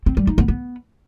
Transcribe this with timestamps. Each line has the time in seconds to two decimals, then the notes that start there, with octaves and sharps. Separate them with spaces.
0.06 C4
0.17 G3
0.27 D#4
0.38 B3
0.48 B3